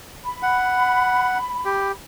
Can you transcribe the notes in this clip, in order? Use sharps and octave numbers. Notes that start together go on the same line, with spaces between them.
B5
F#5
G4